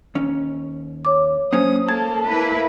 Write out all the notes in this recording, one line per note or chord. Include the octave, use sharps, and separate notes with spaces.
D#2 C#4
C#5 D6
F#3 A#3 C#4 C5 D#6
A#3 A4 A5 G#6
A#3 E4 B4